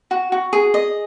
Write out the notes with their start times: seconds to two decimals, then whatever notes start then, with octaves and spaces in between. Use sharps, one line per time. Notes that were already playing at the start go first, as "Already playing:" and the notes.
0.11 F#4
0.32 F#4
0.53 G#4
0.74 D#5